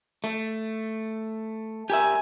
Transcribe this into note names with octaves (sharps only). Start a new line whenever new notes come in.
A3
G4 A#4 E5 G#5